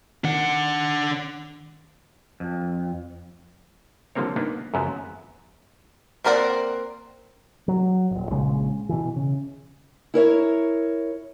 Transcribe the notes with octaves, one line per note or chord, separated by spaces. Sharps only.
D#3 D4 F#5
F2
D3 F3 G3 A#3 C4 C#5
A#3 B3 D4 D#4
F#2 C#3 F3 F#3 B3
A#3 C4 A#4 D5 F#5
F#3
D#1 G#1
A#1 C#3 G#3
B2 E3
C#3
E4 A#4 C#5 E5